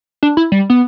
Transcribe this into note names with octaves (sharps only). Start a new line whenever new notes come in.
D4
E4
G3
B3